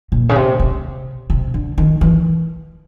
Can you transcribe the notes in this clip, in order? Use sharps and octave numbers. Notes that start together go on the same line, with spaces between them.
A#2
C#3
C3
C3
C3
D3
D#3
E3